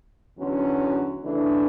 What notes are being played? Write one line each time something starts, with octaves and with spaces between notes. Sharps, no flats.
E2 D3 F#3 C#4 F#4
C#3 E3 A3 D4